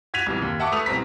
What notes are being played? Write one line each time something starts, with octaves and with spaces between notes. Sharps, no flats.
F#4 G#6 B6 D#7 F7
C2 F2 B2
F#1 D#2
E5 F#5 A5 C#6 D6
A3 B4 D#6 F7
C2 B2 C4 A#5 B6